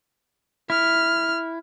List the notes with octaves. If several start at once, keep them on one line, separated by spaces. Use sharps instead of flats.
E4 F6